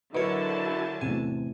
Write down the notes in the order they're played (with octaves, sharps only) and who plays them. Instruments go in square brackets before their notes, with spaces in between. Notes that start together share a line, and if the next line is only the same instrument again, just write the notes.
[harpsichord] B2 C#5 [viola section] D3 F#3 A5 [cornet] E4 [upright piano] A#4 B4
[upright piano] A1 E2 C3 [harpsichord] G#5